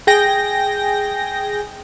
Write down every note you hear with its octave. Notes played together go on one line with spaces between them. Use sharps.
G#4 G5 A#6